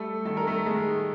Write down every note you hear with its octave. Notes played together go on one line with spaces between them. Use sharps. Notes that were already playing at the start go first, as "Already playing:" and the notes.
Already playing: G3 A3 A4
D#3 A4
A#4
A3 A4
D#3 G#3 G#4
G#4